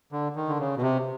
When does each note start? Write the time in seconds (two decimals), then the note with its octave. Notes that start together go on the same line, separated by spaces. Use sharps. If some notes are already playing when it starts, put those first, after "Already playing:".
0.12 D3
0.36 D#3
0.48 D3
0.59 C#3
0.76 B2
0.82 C3